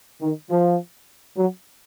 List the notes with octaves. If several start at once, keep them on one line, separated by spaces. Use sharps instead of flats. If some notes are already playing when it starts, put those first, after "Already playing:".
D#3
F3
F#3